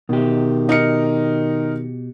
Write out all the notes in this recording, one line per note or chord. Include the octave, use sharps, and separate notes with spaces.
B2 D#3 G4
D#4 A#4 C#7